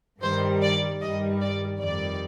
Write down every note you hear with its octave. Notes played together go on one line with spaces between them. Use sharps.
G2 D#3 G3 C5
D5
G2 D#3 G3 D#5
D5
F2 D#3 G3 D5